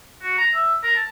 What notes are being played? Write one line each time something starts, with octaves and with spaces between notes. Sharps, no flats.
F#4
A#5
E5
A#4
A5